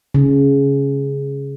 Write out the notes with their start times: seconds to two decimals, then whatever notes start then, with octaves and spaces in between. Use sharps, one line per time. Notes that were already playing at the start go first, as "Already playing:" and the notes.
0.14 C#3